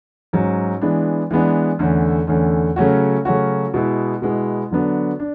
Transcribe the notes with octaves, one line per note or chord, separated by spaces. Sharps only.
G#2 F#3 C#4
E3 G#3 B3 D4
E3 G#3 B3 D4
E2 D3 A3 C#4
E2 D3 A3 C#4
C#3 F#3 A3 C#4 F#4
C#3 F#3 A3 C#4 F#4
B2 G#3 B3 E4
B2 G#3 B3 E4
D3 F#3 B3 D4
D4